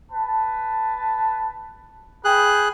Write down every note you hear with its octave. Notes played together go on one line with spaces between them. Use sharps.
B4 A5
G#4 B4 G5 F#6